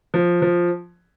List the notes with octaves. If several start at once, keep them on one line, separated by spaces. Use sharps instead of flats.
F3
F3